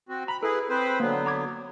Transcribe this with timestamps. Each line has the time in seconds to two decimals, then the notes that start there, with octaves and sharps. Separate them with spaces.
0.09 C4 F#4
0.28 A#5 B5
0.43 E4 G#4 A4 B4
0.70 C4 B4 C5
1.00 D3 F#3 A#3 B3
1.26 A#5 D6 G#6